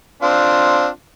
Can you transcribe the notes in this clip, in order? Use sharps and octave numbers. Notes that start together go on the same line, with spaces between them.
C4 D4 F4